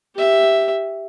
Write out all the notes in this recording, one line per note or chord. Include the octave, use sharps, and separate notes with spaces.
G4 E5